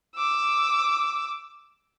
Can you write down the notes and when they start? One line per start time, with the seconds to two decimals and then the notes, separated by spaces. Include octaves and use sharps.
0.17 D6 E6